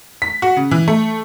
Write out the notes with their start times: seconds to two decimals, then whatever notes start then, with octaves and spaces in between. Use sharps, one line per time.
0.22 B6
0.42 F#4
0.57 C#3
0.71 E3
0.88 A3